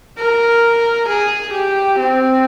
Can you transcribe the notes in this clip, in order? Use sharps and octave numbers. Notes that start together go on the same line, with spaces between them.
A#4
G#4
G4
C4